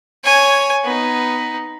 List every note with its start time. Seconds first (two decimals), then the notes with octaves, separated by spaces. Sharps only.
0.24 C#5 G#5
0.84 B3 D#4